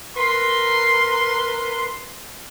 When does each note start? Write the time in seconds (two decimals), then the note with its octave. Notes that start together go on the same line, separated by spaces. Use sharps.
0.17 A#4 B4 C6